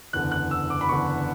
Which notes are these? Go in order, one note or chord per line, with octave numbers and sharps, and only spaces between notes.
F#1 E2 D3 F#6
F#6
E6
D6
B5
F#1 E2 D3 C#6